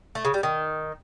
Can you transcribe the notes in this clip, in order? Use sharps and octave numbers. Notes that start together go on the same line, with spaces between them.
A3
C#3
G3
D#3